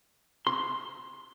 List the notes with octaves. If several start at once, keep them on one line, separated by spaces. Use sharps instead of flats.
C6